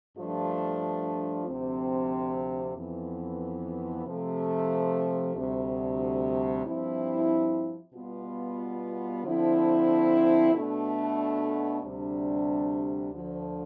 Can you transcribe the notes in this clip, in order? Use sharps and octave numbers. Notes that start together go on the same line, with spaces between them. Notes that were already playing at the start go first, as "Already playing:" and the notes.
G2 F3 A3 D4 F4
D2 C3 F3 C4
F2 E3 B3
C3 F3 A3
D2 C3 G3
G2 F3 C4 E4
B2 G3 B3 F4
D3 F3 C4 E4
B2 A3 D4
D2 C3 G3 D4
D2 D3 F3